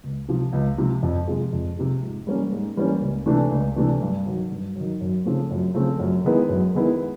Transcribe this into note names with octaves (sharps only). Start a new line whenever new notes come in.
C#2
C3 F3
C#2
C3 F3
F2
C3 F3 G#3
F2
C3 F3 G#3
G#2
E3 G3 A#3 C#4
G#2
E3 G3 A#3 C#4
C#2
C3 E3 A3 D4
C#2
C3 E3 A3 D4
G2
D#3 F#3
G2
D#3 F#3
F#2
C#3 F3 A3 C4
F#2
C#3 F3 A3 C4
F#2
D#3 G#3 B3 E4
F#2
D#3 G#3 B3 E4